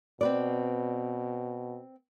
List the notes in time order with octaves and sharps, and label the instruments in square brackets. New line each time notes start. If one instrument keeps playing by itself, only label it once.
[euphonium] B2 [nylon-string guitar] C4 B4 D5